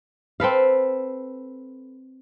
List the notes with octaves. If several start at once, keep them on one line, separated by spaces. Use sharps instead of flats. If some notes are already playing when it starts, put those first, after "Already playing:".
C4 A4 B4 F5